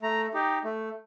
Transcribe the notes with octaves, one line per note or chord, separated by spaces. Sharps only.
A3 A#5
D#4 G4
A3